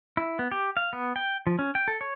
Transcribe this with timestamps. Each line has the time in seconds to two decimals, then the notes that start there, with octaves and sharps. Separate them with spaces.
0.17 E4
0.39 B3
0.52 G4
0.77 F5
0.93 B3
1.16 G5
1.47 F3
1.59 C#4
1.75 G5
1.88 A4
2.01 C#5